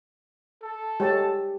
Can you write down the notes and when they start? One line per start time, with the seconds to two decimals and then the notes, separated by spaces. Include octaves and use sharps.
0.63 A4
1.00 G#3 G4 C#5 A5